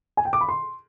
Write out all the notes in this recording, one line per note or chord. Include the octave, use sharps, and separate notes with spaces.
G#5
G5
D6
B5
C6